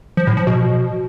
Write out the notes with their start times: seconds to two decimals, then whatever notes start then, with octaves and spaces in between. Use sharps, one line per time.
0.17 F3
0.27 A2
0.37 F3
0.47 B2